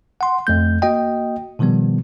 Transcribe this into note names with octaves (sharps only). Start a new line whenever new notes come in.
F#5 C6
F2 A3 G6
A#3 F#4 D#5 G5
B2 D#3 F3 G3 B3